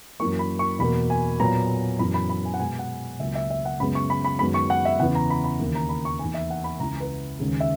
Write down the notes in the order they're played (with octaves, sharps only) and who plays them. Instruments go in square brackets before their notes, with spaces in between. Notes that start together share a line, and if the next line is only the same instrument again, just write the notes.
[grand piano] F#2 E3 A#3 C#6
B5
C#6
E2 B2 A#3 B5
G#5
A#2 F#3 B3 A#5
F#2 E3 B3 B5
B5
B5
G#5
F#5
B2 G#3 B3 G#5
F#5
C#2 C#3 F#3 A#3 E5
E5
E5
F#5
F#2 C#3 G#3 B3 B5
C#6
B5
B5
F#2 D#3 G#3 B3 B5
C#6
F#5
E5
E2 C#3 E3 B3 F#5
A#5
B5
B5
D#2 C#3 E3 A#3
A#5
B5
C#6
E2 D#3 A#3 G#5
E5
F#5
B5
C#2 C#3 E3 A#5
B4
D#2 C#3 G#3
E5